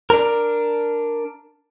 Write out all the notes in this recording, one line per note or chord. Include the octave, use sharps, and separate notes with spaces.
D4 A#4